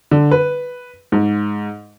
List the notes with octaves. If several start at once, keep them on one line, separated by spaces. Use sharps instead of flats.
D3
B4
G#2